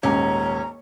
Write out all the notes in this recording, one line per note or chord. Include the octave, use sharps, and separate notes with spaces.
D#1 G#2 C#4 A#5